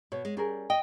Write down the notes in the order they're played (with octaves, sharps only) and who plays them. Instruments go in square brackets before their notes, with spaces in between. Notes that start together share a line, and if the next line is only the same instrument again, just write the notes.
[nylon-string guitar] B2 [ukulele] C#5
[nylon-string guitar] G#3
[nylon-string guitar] G3 [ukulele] C#4 G#4 A#4
[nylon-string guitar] D#5 [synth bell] G5